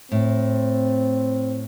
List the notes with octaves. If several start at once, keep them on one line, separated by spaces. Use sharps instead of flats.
A2 C4